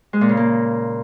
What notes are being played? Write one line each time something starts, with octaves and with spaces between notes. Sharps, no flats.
G#3
A#2
C#3
A#3